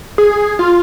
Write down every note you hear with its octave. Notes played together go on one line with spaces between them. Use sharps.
G#4
F4